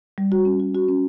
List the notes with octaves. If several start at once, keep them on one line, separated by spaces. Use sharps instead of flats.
G3
F#4
C#4
F#4
F#4
C#4